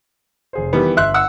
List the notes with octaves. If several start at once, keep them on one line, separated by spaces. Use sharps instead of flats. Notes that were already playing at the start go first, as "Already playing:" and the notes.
F1 G#4 C5
D#3 E3 G3 B3
G1 E5 C6 F#6
F#5 E6